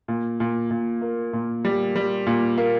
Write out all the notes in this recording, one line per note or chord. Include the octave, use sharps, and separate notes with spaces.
A#2
A#2
A#2
A#3
A#2
G3
G3
A#2
A#3